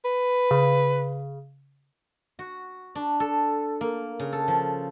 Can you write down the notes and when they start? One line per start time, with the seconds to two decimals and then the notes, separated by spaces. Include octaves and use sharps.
0.05 B4
0.51 C#3
2.39 F#4
2.95 D4
3.20 A4
3.81 A#3
4.20 C#3
4.33 A4
4.48 F3